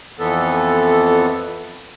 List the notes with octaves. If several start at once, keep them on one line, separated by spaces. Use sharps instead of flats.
F2 E3 B3 A4